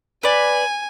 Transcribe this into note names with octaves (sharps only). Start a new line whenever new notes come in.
B4 D5 G#5